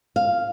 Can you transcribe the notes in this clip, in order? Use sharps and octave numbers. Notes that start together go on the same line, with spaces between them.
F5